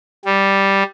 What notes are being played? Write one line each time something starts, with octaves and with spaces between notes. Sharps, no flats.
G3